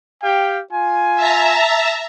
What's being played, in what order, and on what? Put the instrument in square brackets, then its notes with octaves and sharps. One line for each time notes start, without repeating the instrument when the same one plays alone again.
[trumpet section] G4 F5 G5
F4 G#5
[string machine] E5 A5 A#5